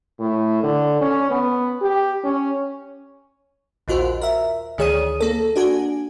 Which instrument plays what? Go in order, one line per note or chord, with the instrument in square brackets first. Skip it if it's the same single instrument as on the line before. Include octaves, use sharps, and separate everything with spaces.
[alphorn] A2
D3
C#4
B3
G4
C#4
[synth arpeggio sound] A#1 D#2 F4 F#4 C5
A#4 E5
D2 D#3 G#4 C#5 D#6 D#7
A#3 A4
D4 F#4 G#5